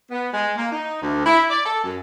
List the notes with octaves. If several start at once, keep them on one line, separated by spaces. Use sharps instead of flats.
B3
G#3
A#3
D#4
D2
E4
D5
A4
F#2